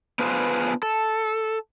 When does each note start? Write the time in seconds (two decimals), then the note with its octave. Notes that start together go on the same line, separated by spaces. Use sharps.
0.19 B3 D4 F4 G#4 B4 C5
0.83 A4